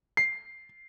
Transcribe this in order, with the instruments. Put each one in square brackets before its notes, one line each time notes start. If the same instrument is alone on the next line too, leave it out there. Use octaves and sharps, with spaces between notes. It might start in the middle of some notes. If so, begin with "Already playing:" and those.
[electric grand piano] C7